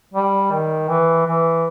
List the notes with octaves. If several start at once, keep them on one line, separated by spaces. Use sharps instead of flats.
G3
D#3
E3
E3